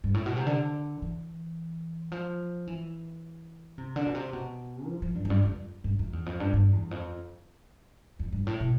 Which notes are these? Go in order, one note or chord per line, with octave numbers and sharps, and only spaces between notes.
G2
A2
B2
C3
D3
E3
F3
E3
C3
D3
B2
C3
B2
F3
F3
G2
F2
G2
F2
G2
F2
E2
F2
G2
G2
E2
F2
F2
G2
A2
B2